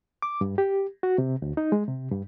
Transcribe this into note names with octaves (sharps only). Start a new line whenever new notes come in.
D6
G2
G4
F#4
C3
D2
D#4
G#3
C3
G2